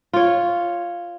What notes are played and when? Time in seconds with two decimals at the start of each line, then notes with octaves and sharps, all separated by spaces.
0.13 F4 C#5